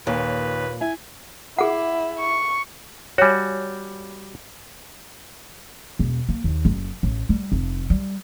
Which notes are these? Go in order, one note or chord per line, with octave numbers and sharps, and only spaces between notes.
D#2 A#2 B4 C#5
E4 G#5
E4 G#4 F#5
C#6
G3 F#4 C#5 G#5
E1
A#3
D#2
F#1
A1
G3
F1
G3